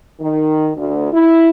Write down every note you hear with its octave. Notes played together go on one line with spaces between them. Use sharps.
D#3
D2
E4